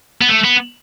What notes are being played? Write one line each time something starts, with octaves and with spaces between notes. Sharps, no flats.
B3
A3
B3